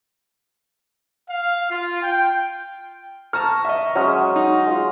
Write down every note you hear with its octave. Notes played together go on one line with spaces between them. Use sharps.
F5
F4
G5
A5 A#5 C#6 F6
D#5 E5
F#3 G#3 C#4 E5 D#6 F6
D#4
G#3 F4